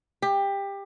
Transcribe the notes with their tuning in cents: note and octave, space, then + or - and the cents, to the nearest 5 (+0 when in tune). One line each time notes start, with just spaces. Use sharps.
G4 +20